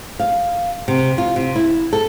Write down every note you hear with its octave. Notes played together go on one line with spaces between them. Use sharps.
F5
C3
F4
C3
E4
A4